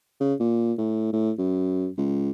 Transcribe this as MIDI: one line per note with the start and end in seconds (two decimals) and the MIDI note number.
0.20 0.34 49
0.40 0.73 46
0.78 1.11 45
1.13 1.32 45
1.38 1.89 42
1.98 2.31 37